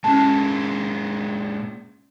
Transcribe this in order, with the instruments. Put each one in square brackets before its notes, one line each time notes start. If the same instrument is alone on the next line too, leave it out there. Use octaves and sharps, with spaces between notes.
[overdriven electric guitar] A#2 G#3 [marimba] C#4 A5